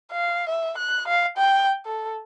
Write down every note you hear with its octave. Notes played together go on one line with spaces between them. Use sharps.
F5
E5
F#6
F5
G5
A4